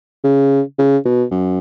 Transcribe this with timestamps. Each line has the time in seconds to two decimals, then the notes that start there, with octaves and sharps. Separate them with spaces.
0.24 C#3
0.79 C#3
1.05 B2
1.31 F#2